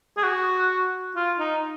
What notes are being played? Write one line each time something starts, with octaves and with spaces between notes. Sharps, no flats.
G#4
F#4
F4
D#4